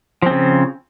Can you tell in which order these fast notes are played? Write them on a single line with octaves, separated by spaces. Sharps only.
F3 C4 C#3